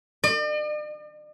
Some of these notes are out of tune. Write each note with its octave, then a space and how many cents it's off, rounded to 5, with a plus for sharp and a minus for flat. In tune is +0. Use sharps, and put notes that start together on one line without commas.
D5 +45